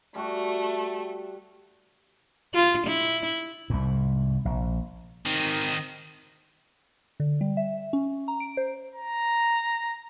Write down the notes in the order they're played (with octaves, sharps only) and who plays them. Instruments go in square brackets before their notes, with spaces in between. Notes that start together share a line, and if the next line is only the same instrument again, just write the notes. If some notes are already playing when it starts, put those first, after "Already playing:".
[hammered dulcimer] G3 F#4 [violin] A3
[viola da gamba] F4
E4
[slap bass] C2 G#2
A#1
[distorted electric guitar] D#3 C4
[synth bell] D3
G3
E5
C#4
A#5
D7
C5
[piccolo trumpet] A#5